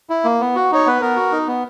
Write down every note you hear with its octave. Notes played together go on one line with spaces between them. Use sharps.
E4
A#3
B3
F#4
D#4 C#5
B3 B4
B3 A#4
F#4
D#4
B3